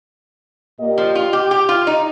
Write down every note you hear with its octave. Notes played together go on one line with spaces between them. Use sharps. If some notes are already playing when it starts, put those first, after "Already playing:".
A#2 A#3 G4 D#5
F3
F4
G4
G4
F4
D#4